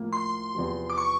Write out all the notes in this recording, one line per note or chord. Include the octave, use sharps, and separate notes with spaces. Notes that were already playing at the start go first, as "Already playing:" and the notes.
Already playing: A2 F3 A#3
C6
E2 C3 F3
D6
C#6